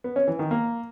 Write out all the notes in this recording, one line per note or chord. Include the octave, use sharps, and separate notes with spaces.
B3
C#4
E3
D#3
A#3